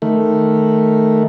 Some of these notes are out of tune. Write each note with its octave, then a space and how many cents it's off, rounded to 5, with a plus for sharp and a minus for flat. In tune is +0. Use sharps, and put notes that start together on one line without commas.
D#3 +0 A3 +0